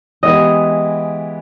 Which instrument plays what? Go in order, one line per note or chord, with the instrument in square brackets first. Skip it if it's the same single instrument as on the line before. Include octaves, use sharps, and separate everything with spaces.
[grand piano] E3 G#3 B3 E4 G4 [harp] D#5